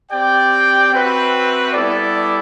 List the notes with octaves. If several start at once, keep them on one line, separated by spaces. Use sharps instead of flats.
C4 G4 D5 G5
C4 F#4 B4 E5 G5
G3 B3 E4 A4 D5